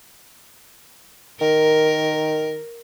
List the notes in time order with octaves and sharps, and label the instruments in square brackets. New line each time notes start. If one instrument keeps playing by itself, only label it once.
[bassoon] D#3 [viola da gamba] A#4